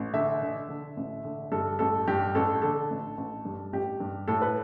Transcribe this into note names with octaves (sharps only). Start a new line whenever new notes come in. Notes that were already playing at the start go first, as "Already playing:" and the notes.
Already playing: A1
D3 E5
D3
D3
A1
D3
G2 A4
A1 A4
G2 G4
A1 A4
D3 A4
A1
A1
G2
A1 G4
G2
A2 A4
B4